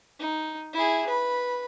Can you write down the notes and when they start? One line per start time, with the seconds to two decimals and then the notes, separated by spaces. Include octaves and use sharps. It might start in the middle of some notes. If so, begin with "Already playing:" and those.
0.20 D#4
0.74 E4 G#4
1.07 B4 B5